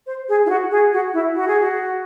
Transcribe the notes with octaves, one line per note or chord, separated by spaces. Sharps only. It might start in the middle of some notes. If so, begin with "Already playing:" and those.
C5
G#4
E4
F#4
G#4
F#4
E4
F#4
G#4
F#4